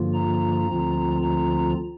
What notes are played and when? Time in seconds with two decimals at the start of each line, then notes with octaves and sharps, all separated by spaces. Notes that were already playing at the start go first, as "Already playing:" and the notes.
Already playing: G2 D3 F3 A#3 F4
0.14 A#5
0.67 D2 D3 F3 C4 F4
1.21 A#5